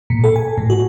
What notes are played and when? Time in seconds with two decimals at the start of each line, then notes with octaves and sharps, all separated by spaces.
0.10 A#2
0.24 A4
0.36 G#5
0.58 A2
0.70 F#4